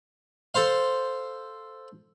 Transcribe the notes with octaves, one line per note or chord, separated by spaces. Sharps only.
A4 C5 F5